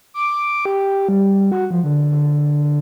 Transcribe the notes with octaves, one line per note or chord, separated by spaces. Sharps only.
D6
G4
G3
F#4
F3
D3
D3